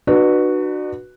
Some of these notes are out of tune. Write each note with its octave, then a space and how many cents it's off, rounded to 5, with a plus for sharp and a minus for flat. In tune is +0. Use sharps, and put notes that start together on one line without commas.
D4 +40 F#4 +0 B4 -10